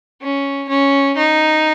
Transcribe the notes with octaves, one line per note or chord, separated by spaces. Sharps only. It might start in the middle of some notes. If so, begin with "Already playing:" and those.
C#4
C#4
D#4